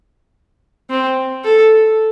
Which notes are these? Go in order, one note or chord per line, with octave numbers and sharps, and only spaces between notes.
C4
A4